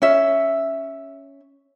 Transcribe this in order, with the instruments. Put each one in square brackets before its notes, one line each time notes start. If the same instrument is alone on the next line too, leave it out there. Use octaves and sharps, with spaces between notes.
[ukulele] C#4 E5